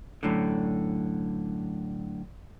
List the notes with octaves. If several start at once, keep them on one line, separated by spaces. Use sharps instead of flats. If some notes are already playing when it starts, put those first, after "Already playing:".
F#2 A2 D3